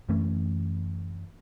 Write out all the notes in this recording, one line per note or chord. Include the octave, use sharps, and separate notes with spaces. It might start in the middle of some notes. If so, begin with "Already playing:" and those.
F#2 E3 A3 C#4